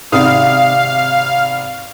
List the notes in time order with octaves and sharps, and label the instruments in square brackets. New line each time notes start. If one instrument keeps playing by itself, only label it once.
[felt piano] G#1 C3 D#6 [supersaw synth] F5